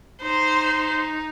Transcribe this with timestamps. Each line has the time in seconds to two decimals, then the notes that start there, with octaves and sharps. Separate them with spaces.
0.22 D#4 C5